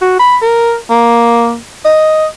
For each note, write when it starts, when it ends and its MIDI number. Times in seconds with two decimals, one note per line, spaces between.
0.02 0.19 66
0.20 0.37 83
0.42 0.77 70
0.90 1.57 58
1.85 2.26 75